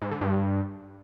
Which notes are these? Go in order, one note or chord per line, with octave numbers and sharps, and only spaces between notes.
G#2
D3
G2